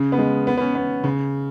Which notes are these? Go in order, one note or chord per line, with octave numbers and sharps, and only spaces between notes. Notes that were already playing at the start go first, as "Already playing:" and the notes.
Already playing: C#3
B3
G#3
B3
B3
C#4
B3
C#3